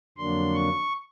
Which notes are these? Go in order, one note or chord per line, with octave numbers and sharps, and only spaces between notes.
F2 D3 F#3 A#3 D4 C6
C#6